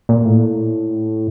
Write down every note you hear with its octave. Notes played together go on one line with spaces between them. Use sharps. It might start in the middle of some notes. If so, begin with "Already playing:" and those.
A#2
A2